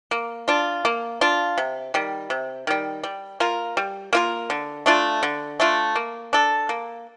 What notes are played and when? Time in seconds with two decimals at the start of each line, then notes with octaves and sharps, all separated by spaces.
0.11 A#3
0.48 D4 F4
0.85 A#3
1.21 D4 F4
1.58 C3
1.94 D#3 G3
2.30 C3
2.67 D#3 G3
3.03 G3
3.40 A#3 F4 A#4
3.77 G3
4.13 A#3 F4 A#4
4.50 D3
4.86 A3 D4 F4
5.23 D3
5.60 A3 D4 F4
5.95 A#3
6.33 D4 A4
6.69 A#3